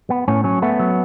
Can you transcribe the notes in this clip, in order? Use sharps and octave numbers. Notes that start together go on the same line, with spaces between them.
B3
A2 C#4
F#3 C#4
A3 B3
F#3